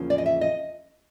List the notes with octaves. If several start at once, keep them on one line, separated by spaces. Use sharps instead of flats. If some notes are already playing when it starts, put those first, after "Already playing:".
Already playing: E2 C#3 F3 A#3 C#4
D5
D#5
E5
D#5